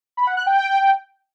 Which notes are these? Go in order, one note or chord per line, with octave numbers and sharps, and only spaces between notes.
B5
F#5
F#6
G5